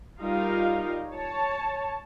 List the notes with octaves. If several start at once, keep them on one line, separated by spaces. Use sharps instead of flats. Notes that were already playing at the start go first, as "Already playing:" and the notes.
G3 D#4 F4 A#4 D#5 F5
C#5 A5